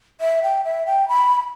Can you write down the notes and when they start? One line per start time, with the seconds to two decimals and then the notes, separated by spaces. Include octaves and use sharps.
0.21 E5
0.43 G5
0.64 E5
0.86 G5
1.08 B5